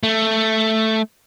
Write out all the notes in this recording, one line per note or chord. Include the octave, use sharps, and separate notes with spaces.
A3